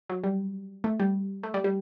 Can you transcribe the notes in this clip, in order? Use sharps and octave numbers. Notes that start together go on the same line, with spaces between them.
F#3
G3
A3
G3
A3
G3
G3